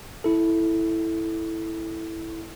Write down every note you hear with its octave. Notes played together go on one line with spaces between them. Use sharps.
E4 A4